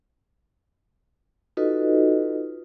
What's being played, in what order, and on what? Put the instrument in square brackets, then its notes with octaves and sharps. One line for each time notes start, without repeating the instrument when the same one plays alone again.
[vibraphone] D#4 F4 F#4 A4 B4 D#5